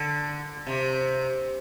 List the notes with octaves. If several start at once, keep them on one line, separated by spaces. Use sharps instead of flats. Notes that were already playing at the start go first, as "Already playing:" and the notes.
Already playing: D3
C3